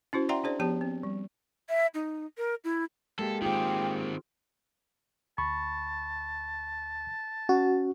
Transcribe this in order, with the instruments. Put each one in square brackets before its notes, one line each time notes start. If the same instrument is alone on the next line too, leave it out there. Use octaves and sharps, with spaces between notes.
[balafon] C#4 E4 F#4 C5
D5 E5 F#5 G5 A#5 C6
D4 G#4 C5 D5
F3 B3 G4 A5
C4
G3
[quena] E5
D#4
A#4
E4
[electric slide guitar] G#3 A#3 G4 [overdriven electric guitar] A4
[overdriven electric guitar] D#3 C4 [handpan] F4 G#4 [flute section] G5 D6
[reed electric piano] D2 B5 C#6 [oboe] A5
[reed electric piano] C#4 [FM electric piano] F#4